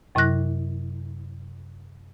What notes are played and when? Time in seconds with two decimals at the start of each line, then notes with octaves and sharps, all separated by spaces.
0.15 F#2 C3 F#3 E4 F#6 A#6